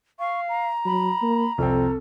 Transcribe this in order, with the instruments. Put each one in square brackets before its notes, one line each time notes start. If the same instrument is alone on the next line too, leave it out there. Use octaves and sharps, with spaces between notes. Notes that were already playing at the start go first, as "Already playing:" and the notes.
[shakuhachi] F5 [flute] C#6
[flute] A#5
[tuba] F#3 [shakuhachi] B5
[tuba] A#3
[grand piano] C2 C4 [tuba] F2 [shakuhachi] A4